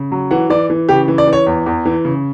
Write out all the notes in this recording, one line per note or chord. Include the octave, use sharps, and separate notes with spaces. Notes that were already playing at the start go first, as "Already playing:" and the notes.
Already playing: C#3
F#3
E3 F#5
E3 D5
E3
C#3 G4
E3
D5
E3
C#5
E2
E2
E3
C#3